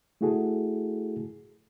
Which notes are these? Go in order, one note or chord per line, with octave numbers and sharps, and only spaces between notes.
A3 E4 F#4 G#4 A4